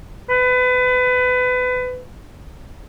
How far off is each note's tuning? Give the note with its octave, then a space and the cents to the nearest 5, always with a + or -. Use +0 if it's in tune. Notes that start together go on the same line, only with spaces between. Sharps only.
B4 +25